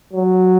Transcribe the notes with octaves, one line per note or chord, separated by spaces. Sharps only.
F#3